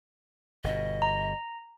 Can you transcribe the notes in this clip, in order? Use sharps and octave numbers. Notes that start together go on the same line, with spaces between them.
G1 B2 D#5
A#5